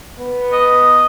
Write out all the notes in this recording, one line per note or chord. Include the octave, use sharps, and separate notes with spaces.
B3
D#5